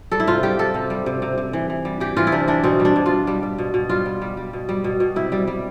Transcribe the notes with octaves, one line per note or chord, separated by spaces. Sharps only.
G3 A4
E4
C3 F4
G3 G4
G3 A4
C3
G3
C3
C3
C3
E3
E3
G3
E3 G4
E3 F4
E4
C3 D4
E3 D4
B2 C4
G3
D4
B2
F4
G3
G3
G3
B2
B2
G3 F4
G3
G3
G3
B2
G3
B2
B2
C3 E4
G3
G3